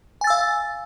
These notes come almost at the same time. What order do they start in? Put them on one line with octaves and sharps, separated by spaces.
G#5 A6 E6 F5